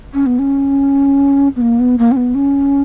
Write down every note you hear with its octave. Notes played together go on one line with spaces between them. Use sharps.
C#4
B3
C#4
B3
A#3
B3
A#3
C#4
B3
C#4